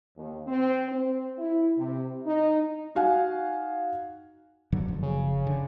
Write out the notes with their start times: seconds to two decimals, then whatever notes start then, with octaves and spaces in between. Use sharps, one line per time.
0.17 D#2
0.47 C4
0.92 C4
1.38 E4
1.78 C3
2.26 D#4
2.95 D#4 F#4 F5 F#5 G#5
4.72 G2 D3 F#3
4.88 F#1 F3
5.02 C#3
5.47 D3